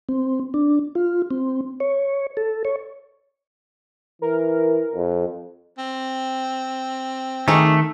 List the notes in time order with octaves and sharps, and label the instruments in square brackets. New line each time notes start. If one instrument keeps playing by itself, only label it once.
[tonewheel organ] C4
D4
F4
C4
C#5
A4
C#5
[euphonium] E3 [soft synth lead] A#4
[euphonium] F2
[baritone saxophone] C4
[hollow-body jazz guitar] D#3 [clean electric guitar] A3 [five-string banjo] D#4 G4 G#4